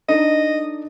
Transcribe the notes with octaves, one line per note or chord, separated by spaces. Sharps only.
D4 D#4 A4 D#5